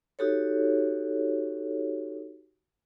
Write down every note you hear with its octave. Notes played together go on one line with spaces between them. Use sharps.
D#4 F#4 G4 A4 C#5